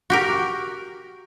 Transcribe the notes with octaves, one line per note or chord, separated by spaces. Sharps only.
F#4 G4 A#4